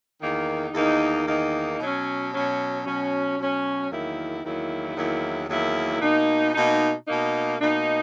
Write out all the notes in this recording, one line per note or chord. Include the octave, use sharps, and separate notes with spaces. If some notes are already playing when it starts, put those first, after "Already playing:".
E2 D#3 A#3 D#4
E2 D#3 A#3 D#4
E2 D#3 A#3 D#4
B2 F#3 C#4
B2 F#3 C#4
B2 F#3 C#4
B2 F#3 C#4
E2 D#3 F#3 A#3 E4
E2 D#3 F#3 A#3 E4
E2 D#3 F#3 A#3 E4
E2 D#3 F#3 A#3 E4
B2 A#3 D#4
B2 A#3 D#4
B2 A#3 D#4
B2 A#3 D#4